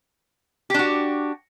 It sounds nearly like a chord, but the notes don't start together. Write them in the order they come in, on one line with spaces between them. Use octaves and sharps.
G4 D4 F#4